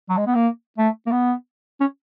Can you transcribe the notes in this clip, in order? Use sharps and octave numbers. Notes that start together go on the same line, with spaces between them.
F#3
G#3
B3
A#3
A3
A#3
B3
C#4